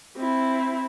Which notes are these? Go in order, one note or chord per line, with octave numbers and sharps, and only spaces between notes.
C4 E4